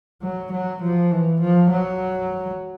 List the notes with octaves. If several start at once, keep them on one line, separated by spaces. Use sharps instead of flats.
F#3
F#3
F3
E3
F3
F#3